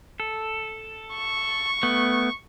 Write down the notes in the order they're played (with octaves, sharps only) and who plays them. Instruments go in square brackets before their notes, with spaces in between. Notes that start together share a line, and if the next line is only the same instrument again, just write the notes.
[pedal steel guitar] A4
[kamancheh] C#6
[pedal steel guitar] A3 B3